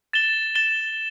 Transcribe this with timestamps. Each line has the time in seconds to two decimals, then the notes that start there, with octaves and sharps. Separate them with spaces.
0.13 A6 E7 G7
0.55 A6 E7 G7